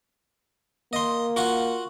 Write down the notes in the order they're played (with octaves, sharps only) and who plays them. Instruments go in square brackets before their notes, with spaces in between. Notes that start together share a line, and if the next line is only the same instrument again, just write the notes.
[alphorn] A#3 [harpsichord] D#5 C6
[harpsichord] F4 F#4 F#5